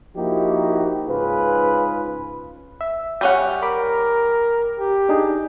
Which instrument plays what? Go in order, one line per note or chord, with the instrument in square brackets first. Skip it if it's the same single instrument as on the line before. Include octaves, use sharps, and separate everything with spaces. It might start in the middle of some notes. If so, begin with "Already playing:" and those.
[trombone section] F3 A#3 D#4 E4 F#4 G4
G#2 C#3 F4 G#4 B4
[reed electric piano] E5
[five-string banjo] G3 C#4 F#5
[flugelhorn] A#4 [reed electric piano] B5 D6
[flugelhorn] G4
[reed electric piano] D4 D#4 G#4